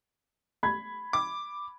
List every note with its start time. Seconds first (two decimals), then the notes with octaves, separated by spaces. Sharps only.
0.63 B5 G#6
1.13 D6